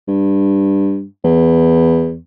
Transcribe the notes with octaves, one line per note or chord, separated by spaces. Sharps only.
G2
E2